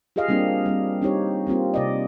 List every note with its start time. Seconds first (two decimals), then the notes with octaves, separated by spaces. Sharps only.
0.16 F4 G4 G#4 D#5 F5
0.28 G3 A#3 C4 D4 G4
0.66 G3 C4
1.02 C4 D#4 G4 C#5
1.47 G3 A#3 C4 F4
1.74 C3 D5 D#5